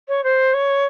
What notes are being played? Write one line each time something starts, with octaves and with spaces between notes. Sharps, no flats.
C#5
C5
C#5